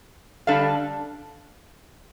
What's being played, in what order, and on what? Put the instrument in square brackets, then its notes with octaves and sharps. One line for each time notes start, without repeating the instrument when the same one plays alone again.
[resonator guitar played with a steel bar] D3 G3 D4 A4 F5